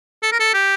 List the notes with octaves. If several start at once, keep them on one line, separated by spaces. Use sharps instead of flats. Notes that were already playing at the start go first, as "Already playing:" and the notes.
A4
A#4
A4
G4